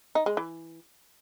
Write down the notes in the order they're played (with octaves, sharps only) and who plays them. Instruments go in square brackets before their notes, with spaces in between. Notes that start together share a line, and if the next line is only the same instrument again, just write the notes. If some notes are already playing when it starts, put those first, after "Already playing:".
[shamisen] D#4
G#3
E3